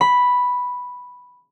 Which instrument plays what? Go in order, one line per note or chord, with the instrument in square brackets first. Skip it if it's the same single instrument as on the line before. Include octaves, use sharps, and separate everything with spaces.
[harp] B5